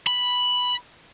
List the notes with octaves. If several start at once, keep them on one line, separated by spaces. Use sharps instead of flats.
B5